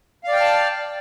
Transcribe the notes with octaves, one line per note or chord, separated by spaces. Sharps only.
D5 F5 G5 A5 F6